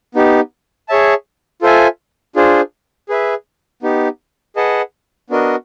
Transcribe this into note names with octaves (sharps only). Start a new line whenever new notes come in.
B3 D#4 G4
G#4 C#5 E5 A5
F4 A4 C5 E5 G#5
D4 F4 G#4 C5
G#4 B4 E5
B3 D#4 G4
G#4 B4 D#5 F#5 A5
B3 D4 F#4 A#4 D#5